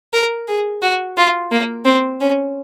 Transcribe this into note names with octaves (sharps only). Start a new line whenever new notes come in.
A#4
G#4
F#4
F4
A#3
C4
C#4